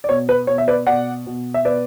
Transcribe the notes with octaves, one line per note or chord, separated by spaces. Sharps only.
D5
B2 C#5
B4
B2 C#5
E5
B4 D5
B2 D5 F#5
B2
E5
B2 B4 D5